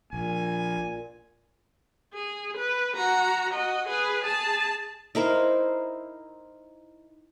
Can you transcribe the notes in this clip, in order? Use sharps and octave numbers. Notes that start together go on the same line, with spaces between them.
A#1 A#2 G#5
G#4
B4
F#4 A#5
F#4 D#5
G#4 B4
G#4 A5
D#4 E4 A#4 C5